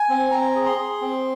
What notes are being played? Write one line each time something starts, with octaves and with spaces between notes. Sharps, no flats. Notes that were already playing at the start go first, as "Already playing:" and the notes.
Already playing: G#5
C4
C4 A#5
G#4
C6
G#4
C4